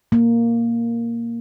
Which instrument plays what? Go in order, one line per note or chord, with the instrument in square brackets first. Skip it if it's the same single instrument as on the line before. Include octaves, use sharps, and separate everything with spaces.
[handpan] A#3